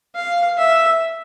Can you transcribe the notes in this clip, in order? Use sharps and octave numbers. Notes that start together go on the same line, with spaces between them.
F5
E5